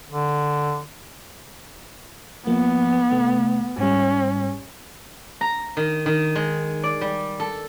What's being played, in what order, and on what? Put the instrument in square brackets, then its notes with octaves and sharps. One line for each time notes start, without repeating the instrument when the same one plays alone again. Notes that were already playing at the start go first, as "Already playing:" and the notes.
[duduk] D3
[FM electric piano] F3 A#3 [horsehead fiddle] B3
[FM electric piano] C3 A3 F#5
[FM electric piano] G#2 G3 [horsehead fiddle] C#4
[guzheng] A#5
D#3
D#3
G#3
D5
G3
A4